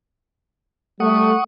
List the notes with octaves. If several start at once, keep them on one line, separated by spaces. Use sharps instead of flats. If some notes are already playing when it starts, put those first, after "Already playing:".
G3 A3 F#5 C#6 D#6